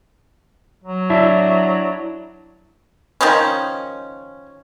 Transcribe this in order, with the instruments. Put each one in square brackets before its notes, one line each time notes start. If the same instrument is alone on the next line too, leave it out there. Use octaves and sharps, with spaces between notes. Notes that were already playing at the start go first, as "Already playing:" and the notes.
[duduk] F#3
[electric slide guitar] D4 E4 E5
[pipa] D#3 F3 G#3 C#4